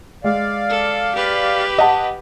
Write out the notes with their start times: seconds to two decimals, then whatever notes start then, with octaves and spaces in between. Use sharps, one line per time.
0.24 G#3 D5 F5
0.69 A4
1.15 G4 B4
1.78 D#5 F#5 A5